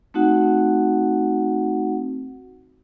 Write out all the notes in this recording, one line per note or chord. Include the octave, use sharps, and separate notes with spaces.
A3 C4 D#4 F#4 F#5